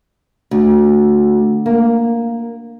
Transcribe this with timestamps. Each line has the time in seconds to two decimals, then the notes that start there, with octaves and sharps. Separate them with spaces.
0.51 D2
1.66 A#3